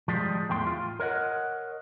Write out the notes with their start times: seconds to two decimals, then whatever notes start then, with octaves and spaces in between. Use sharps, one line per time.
0.08 F3 G3 G#3
0.49 E2 A2 G5 C6
0.67 F4
1.00 A#4 C#5 D#5 F#5